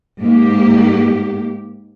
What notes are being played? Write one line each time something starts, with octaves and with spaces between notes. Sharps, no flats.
G#2 A#3 G4